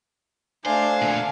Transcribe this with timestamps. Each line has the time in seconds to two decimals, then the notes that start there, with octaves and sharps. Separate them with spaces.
0.66 A3 D4 C5 F5 G#5
1.01 A#2 D3